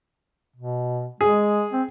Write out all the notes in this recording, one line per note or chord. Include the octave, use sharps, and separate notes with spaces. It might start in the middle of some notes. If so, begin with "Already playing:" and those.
B2
G#3 G#4
C4